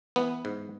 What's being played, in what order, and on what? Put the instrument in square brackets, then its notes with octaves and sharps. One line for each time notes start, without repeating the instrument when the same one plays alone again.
[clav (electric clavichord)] E3 B3
G#2